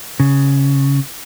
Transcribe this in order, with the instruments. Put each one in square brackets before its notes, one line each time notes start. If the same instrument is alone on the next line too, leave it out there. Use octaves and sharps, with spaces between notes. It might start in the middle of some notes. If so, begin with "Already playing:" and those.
[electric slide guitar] C#3